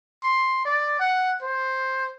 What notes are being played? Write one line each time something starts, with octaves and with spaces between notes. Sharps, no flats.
C6
D5
F#5
C5